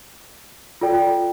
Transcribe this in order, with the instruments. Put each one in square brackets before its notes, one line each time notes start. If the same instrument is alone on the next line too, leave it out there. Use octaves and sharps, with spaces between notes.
[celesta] F4 A4 D5 G5